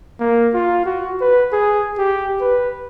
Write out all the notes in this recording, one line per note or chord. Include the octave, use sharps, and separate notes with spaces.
A#3
F4
F#4
B4
G#4
G4
B4